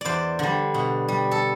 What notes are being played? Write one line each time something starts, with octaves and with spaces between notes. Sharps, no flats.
E2 C5 D5
D3 G3
B2
G3
A4